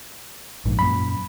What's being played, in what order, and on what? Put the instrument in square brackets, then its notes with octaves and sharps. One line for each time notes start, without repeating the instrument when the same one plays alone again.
[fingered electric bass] A#1 G#2
[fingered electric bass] F#2 A#2 [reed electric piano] B5